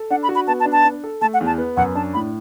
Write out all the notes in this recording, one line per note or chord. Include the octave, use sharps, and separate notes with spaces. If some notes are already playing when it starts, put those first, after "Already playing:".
Already playing: A4
D4 F#5
B5
F#4
B5
B3 A5
A5
D4
A5
D4
A4
A3 A5
F#5
E2
A5
B3
F#2 F#5
D4 A5
A2 B5